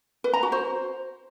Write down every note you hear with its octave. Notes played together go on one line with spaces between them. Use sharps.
B4
A#5
F#4
C5